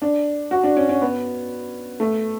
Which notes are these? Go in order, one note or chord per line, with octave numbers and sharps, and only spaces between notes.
D4
F#4
D4
C#4
C#4
B3
A3